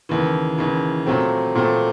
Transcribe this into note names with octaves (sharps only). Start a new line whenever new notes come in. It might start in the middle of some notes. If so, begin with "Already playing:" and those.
D#2 C#3 E3
D#2 C#3 E3
A#2 F#3 A3 C4
A#2 F#3 A3 C4